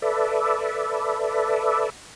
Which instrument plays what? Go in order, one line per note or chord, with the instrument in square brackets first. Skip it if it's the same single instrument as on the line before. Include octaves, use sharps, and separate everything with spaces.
[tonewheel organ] A4 B4 D5 E5